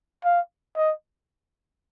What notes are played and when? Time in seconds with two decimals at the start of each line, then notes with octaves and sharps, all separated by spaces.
0.25 F5
0.76 D#5